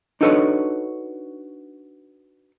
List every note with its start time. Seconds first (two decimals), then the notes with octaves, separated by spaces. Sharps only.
0.21 D4 D#4 F#4 A4 B4 C#5